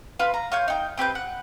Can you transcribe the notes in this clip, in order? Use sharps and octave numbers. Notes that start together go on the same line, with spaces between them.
F4 B4
A#5
F4 C#5 G6
D#4 G5
C4 G4 B4 G6
F#5